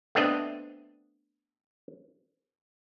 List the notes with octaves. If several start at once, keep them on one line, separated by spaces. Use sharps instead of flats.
A3 B3 C4 D4 D#5